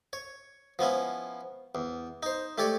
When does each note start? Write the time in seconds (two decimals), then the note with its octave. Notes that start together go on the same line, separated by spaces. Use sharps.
0.13 C#5
0.79 F3 B3 C#4 E4
1.75 E2
2.23 D#4 C5
2.58 A3 G4 A4 C#5 D5